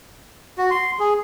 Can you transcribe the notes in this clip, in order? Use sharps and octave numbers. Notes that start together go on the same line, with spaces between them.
F#4
C6
G#4